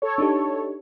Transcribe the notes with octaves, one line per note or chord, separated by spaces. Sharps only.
A4 C#5
D4 D#4 G4